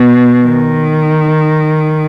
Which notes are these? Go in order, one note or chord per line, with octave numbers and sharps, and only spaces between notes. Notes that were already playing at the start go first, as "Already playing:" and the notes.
Already playing: B2
D#3